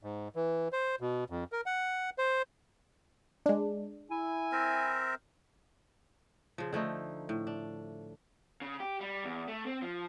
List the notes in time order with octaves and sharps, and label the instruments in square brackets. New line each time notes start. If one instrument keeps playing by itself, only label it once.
[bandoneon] G#2
E3
C5
B2
F2
A#4
F#5
C5
[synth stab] G#3 D4
[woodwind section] E4 G#5
[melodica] C4 A#4 E5
[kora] C#3 F3
D3 F3 A3 D#4
A2
D4
[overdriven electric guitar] C#3
G4
G3
E2
A3
C4
F3